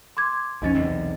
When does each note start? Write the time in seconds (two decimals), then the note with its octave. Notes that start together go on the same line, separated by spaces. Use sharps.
0.17 C6 D6 G#6
0.62 B1 F2 C#4 D#4 D#5 A6
0.75 B1 E2 C3